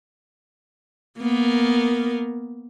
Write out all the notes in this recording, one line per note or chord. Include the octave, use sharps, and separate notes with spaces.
A#3 B3 A#4